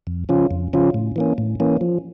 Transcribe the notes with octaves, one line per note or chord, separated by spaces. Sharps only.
F2
C#3 F3 C#4 F4
F2
C#3 F3 C#4 F4
A2
E3 A#3 C#4
A2
E3 A#3 C#4
F3